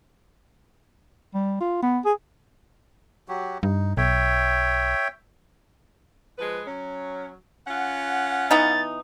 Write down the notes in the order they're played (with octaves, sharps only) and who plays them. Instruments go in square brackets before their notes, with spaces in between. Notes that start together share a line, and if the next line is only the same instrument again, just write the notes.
[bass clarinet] G3
F4
B3
G#4
[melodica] F#3 F#4 G4
[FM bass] G2 [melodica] D#4
[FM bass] B1 [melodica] C#5 E5 G5
[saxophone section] F3 G#3 B4
F#3 C#4
C#4 F4 F#5
[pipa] E3 B3 D#4 [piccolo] A6